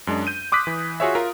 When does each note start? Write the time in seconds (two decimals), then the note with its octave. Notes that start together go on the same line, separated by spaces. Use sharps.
0.07 F#2 G#3 D4
0.27 G6 D#7
0.52 C6 D6 D#6 F#6 B6
0.67 E3
1.00 F4 F#4 G#4 C#5 E5
1.15 F4 A#4